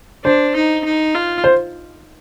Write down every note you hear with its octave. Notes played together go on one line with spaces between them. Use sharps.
D4 C5
D#4
D#4
F4
C5